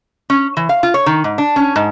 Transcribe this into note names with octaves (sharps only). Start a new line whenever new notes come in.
C#4
E3
F5
F4
C#5
D#3
G#2
D4
C#4
G#2